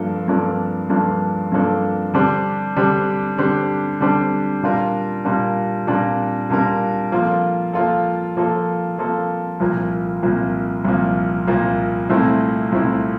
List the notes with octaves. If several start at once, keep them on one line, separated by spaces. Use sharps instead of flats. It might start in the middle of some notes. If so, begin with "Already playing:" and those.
Already playing: G2 F3 A#3 D4 A4
G2 F3 A#3 D4 A4
G2 F3 A#3 D4 A4
G2 F3 A#3 D4 A4
D3 G3 D4 G4 C5
D3 G3 D4 G4 C5
D3 G3 D4 G4 C5
D3 G3 D4 G4 C5
A#2 G3 D4 F4 A#4
A#2 G3 D4 F4 A#4
A#2 G3 D4 F4 A#4
A#2 G3 D4 F4 A#4
F3 A#3 F4 A4
F3 A#3 F4 A4
F3 A#3 F4 A4
F3 A#3 F4 A4
C2 A#2 F3 A#3
C2 A#2 F3 A#3
C2 A#2 F3 A#3
C2 A#2 F3 A#3
C2 A#2 A3 C4 E4
C2 A#2 A3 C4 E4